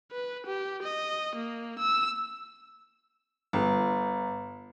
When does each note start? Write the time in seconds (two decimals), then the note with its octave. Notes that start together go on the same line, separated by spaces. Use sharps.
0.12 B4
0.46 G4
0.83 D#5
1.36 A#3
1.79 E6
3.53 G1